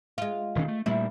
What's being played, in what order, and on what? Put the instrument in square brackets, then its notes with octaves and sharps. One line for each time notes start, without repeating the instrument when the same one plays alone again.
[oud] G#3 F4
[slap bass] E1 D#3 C#4
A3
[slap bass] A#2 G3 A3 [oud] E4